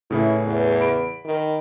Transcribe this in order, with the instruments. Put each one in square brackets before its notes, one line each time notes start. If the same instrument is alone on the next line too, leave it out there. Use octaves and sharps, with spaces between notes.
[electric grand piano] A2 C#3 B4 [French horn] E4
[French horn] E2
[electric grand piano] B5 D7
[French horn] D#3